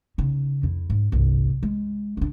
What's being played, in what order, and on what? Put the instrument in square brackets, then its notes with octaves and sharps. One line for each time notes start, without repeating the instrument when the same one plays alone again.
[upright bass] C#3 D#4
F2 E4
G#2
G1 C2
G#3
C#2 D4